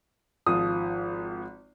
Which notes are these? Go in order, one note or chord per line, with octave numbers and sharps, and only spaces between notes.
G#1 F3 D#6